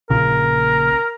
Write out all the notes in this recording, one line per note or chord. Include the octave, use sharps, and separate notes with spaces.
A#1 A#2 C#3 A#4